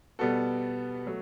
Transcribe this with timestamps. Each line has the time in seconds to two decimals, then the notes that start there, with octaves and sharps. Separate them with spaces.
0.19 B2 G3 B3 F#4 A4
1.06 F#3 A3